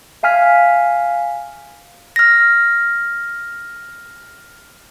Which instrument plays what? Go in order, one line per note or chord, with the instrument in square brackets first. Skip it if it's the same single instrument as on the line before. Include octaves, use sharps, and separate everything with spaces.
[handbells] E5 F5 G#5 F6 B6
[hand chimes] F6 A#6